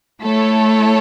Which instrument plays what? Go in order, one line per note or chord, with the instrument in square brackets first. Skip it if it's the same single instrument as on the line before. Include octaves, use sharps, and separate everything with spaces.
[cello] A3 [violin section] E4 A4 C#5